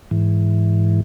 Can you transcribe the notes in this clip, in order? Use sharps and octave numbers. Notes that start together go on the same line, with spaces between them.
G#2 E3